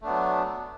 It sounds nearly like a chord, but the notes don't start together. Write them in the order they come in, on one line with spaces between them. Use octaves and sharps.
A3 D4 B3 F#3